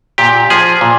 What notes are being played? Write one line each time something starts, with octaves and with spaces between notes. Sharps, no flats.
A#2 G4
F3 G#4
A#2